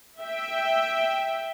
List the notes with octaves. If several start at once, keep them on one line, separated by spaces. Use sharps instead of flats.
E5 G5